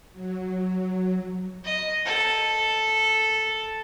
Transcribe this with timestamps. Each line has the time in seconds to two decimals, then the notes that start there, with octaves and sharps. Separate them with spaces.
0.12 F#3
1.65 D#5
2.05 A4